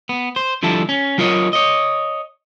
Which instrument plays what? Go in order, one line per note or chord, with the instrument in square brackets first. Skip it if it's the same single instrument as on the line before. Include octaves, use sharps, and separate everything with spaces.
[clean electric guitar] B3
C5
D3 F3 G3 E4 A4
C#4
F#3 F4 A#4 C#5 D#5
C#5 D#5